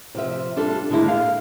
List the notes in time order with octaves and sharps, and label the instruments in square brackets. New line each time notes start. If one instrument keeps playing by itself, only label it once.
[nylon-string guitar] C3 F3 E5
G3 D4 F4 A4
D3 D#3 G#3 A#3 E4
F5